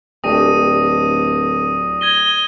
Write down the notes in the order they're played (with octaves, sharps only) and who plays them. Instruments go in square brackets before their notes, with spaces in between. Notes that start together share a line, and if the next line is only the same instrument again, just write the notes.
[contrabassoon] D1 [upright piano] A3 D4 G4 [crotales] D#6 A#6 D#7
[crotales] G#6 A#6 D#7 [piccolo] G7